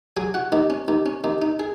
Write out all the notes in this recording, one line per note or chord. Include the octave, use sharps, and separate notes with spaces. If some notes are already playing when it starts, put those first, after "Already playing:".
F#3 G#4 G#5
F#4 F#5
D#2 D#4 D#5
C#4
D#2 D#4
C#4
D#2 D#4
D#4
G#4